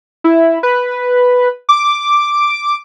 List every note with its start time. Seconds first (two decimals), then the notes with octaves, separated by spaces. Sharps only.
0.24 E4
0.63 B4
1.69 D6